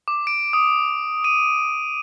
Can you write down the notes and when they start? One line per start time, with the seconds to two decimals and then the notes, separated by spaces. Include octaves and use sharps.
0.08 D6
0.27 D7
0.53 D#6
1.24 D#7